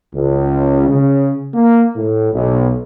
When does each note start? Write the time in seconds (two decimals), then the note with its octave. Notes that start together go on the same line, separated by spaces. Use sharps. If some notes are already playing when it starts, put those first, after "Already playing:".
0.13 C#2
0.89 C#3
1.53 A#3
1.95 A2
2.32 B1